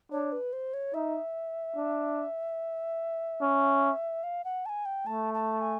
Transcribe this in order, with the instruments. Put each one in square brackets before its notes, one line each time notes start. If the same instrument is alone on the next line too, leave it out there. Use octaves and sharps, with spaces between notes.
[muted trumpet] D4 [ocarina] C#5
[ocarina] B4
C5
C#5
[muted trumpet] D#4 [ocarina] E5
[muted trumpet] D4
C#4
[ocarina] F5
F#5
A5
G#5
G5
[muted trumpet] A3 [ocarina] A5
[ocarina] A5
G#5